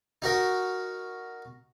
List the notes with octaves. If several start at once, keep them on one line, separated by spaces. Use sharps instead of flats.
D#4 F#4 A#4